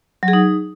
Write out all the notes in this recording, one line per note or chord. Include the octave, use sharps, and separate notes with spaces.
F#3
G#4
D#4